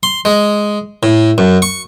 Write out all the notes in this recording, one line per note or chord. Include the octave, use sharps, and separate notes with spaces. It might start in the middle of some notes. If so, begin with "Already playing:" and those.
C6
G#3
A2
F#2
C#6